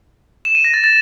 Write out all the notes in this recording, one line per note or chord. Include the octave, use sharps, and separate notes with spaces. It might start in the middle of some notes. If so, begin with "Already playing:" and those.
E7
D#7
A#6
A6
A6